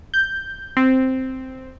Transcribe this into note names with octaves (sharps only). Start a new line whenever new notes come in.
G6
C4